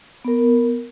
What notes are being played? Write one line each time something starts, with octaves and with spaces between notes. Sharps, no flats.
B3 A#4